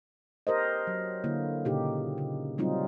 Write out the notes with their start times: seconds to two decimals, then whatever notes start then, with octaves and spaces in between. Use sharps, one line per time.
0.47 G4 A#4 C5 D#5
0.87 F#3
1.24 D3 A#3 E4
1.65 A#2 C#3 D#4 G4
2.18 C#3
2.58 F#3 G3 C4 D#4 F4